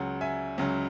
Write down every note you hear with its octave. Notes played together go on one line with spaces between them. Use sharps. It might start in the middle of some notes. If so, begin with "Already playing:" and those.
Already playing: C#2 C#3 F#3 F#5
E5 G#5
C#2 C#3 F#3